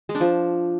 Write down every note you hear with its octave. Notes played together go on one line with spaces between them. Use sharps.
G#3
D4
F3